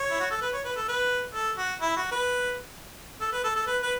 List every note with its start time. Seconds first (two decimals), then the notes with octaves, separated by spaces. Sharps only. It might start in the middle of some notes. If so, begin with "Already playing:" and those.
Already playing: C#5
0.10 E4
0.20 F#4
0.31 A4
0.41 B4
0.53 C#5
0.65 B4
0.76 A4
0.88 B4
1.34 A4
1.58 F#4
1.81 E4
1.97 F#4
2.11 B4
3.21 A4
3.32 B4
3.44 A4
3.56 A4
3.67 B4
3.82 B4